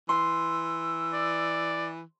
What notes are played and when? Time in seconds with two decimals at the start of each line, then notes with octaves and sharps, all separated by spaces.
0.09 E3 C6 E6
1.13 D5